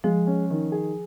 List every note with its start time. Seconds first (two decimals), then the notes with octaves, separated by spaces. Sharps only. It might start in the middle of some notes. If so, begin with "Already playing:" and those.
0.04 F3 G#3
0.27 C#4
0.50 D#3
0.72 G#4